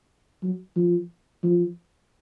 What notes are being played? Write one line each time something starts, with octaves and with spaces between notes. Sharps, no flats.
F#3
F3
F3